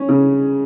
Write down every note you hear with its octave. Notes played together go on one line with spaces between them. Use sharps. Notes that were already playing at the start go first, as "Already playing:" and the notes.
Already playing: C#4
C#3